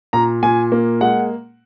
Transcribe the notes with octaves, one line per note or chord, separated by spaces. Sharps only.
A#2 A#5
A#2 G#5
A#3
G#3 F#5